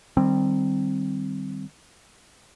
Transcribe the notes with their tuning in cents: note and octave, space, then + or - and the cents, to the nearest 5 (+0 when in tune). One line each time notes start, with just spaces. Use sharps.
D#3 -30 G3 -5 C4 +0